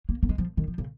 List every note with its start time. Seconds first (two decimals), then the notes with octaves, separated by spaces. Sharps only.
0.09 A#3
0.23 A#3
0.29 G#3
0.38 F3
0.57 D#3
0.68 F3
0.78 C#3